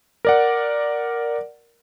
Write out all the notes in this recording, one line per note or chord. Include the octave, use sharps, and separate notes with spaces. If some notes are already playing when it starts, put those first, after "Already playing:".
A#4 D5 F#5